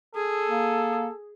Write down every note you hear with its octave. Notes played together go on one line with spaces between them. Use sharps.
G#4 A4
A#3